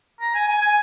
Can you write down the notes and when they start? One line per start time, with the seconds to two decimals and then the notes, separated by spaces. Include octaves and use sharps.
0.21 A#5
0.35 G#5
0.48 G#5
0.62 G#5